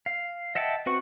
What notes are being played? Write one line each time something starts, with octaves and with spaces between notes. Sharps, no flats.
F5
D#5 E5 F#5 G5 A5
C4 F#4 B4 F#5 C#6